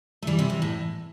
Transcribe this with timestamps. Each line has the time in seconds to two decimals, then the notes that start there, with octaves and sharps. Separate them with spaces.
0.22 A3
0.27 E3 G3
0.39 C3 E3
0.50 C3
0.62 A2